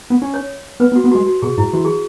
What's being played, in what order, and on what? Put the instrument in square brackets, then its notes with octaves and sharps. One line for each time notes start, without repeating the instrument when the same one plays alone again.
[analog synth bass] B3
C#4
[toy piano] C#5
[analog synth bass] B3 [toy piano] B4
[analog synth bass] B3
[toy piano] F#4
[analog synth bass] B3
[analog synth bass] G#3 [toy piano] F#4
[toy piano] F#4
[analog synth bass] B2 [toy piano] G#4
[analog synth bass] G#2 [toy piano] E4
[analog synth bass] E3 [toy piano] F#4
[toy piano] G#4